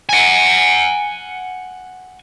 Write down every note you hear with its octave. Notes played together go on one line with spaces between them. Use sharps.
F#5 G#5